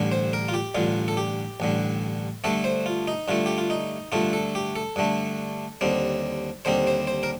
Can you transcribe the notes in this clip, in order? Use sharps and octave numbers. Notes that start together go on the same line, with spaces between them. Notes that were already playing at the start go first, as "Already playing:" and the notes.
Already playing: A1 G2 D3
C5
A#4
F4
G4
A1 G2 D3 F4
A4
G4
A1 G2 D3
G2 D3 A3 A4
C5
F4
D#4
G2 D3 A3 F4
G4
F4
D#4
G2 D3 A3 F4
A4
G4
A4
G2 D3 A3
D#2 D3 G3 C4
D#2 D3 G3 C4 C5
C5
C5
A#4